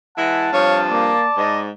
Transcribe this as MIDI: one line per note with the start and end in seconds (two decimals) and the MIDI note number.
0.18 0.49 52
0.18 0.49 56
0.18 0.49 64
0.18 0.48 78
0.18 1.61 81
0.53 1.15 43
0.53 1.15 48
0.53 1.15 53
0.53 0.80 73
0.53 0.82 77
0.90 1.26 58
0.90 1.62 74
1.37 1.70 44
1.37 1.62 75